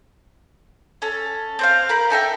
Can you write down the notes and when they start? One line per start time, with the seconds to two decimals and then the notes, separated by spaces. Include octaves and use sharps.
1.02 C#4 A4
1.59 C4 C5 F5
1.89 A#4 C5 B5
2.10 D#4 A4 E5 G5